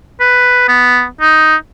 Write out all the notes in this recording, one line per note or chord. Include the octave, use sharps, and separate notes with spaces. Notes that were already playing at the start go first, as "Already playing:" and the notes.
B4
B3
D#4